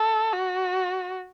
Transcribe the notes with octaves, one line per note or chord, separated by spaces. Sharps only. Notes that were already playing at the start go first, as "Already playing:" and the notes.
Already playing: A4
F#4